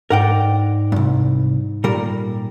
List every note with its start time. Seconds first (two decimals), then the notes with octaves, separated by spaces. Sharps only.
0.10 G#2 A#4 D5 F#5 G5
0.92 C2 G2
1.84 A#2 G3 A#4